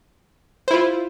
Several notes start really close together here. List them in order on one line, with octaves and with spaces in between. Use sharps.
C5 E4 F4